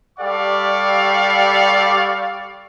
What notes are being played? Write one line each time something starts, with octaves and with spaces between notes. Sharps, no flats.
G3 G4 A4 D5 F5 C#6